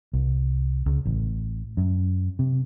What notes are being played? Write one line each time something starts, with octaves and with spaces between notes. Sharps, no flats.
C2
C#2
A1
F#2
C3